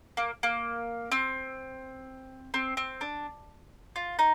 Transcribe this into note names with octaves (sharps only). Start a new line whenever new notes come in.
A#3
A#3
C4
C4
C4
D4
F4
D#4